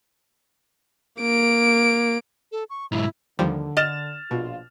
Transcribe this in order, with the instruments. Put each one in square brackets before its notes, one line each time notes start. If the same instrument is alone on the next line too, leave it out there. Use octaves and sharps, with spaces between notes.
[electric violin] A#3 D7
[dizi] A4
C#6
[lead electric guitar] B1 G#2 [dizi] E4
[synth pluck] D#2 F3 G3 [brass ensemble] D3
[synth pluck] D#5 [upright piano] F6 A6 E7
[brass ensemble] A#1 F4 [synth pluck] B2